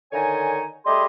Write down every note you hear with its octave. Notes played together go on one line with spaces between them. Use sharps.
D3 D#3 D#4 C#5 G#5
G3 A3 G4 G#4 D#5 C6